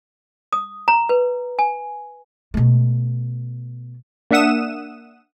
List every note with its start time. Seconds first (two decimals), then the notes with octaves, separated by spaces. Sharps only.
0.53 D#6
0.88 A#5
1.09 B4
1.59 G#5
2.54 B2 A3
4.31 A#3 D4 E5 F#5 D#6 E7